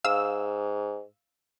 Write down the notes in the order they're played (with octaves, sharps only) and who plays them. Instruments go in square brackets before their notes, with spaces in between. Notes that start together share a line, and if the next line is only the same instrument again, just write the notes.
[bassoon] G#2 [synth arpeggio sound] F5 E6